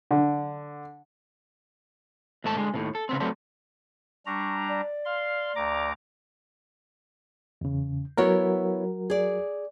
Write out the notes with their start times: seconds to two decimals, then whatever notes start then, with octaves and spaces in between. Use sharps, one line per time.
0.11 D3
2.44 D#2 G#2 A3 A5
2.57 D3 G#3
2.74 D#2 A2 C3
2.95 A4
3.09 C#3 B3 C4
3.20 F#3 G3 A3 B3 C4
4.26 G3 D4 A#5 C#6
4.68 D5
5.05 F5 C6
5.56 D2 A#5 D6
7.61 E2 C#3
8.17 F#3 B3 E4 F#4 A#4 C#5
9.10 G#4 D5